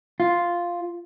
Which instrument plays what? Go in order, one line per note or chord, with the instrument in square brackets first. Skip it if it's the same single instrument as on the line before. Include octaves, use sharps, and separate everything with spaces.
[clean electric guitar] F4